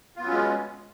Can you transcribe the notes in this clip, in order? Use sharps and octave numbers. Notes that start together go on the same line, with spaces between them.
F#3 G#3 B3 C#4 F4